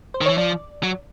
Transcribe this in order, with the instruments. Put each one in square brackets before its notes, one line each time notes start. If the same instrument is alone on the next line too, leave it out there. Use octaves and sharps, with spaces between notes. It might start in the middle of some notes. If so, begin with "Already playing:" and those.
[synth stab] C5
[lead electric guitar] D#3
[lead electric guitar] E3 [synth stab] C#5
[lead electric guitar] F3 [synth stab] D5
[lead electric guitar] F#3